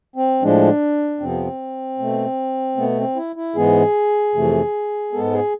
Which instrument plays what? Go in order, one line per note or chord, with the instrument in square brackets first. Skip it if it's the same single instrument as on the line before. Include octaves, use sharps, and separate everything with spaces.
[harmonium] C4
A2 F3 G#3 D4
F2 C3 F3 B3 C4
B2 A3
B2 A3 B3
C4
E4
E4
G#2 E3 G#3 B3 G#4
F2 C3 E3 A3
G#2 G#3 B3 A4
G#4